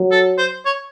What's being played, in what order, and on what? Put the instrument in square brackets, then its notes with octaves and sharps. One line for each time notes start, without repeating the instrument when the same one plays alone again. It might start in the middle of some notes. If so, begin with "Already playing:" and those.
Already playing: [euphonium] F#3
[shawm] A4
C5
C#5